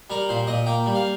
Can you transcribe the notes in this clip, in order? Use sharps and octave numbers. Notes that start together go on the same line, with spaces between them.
G3 A#4
A#2 C5
A#2 D#5
A#3 G5
G3
F5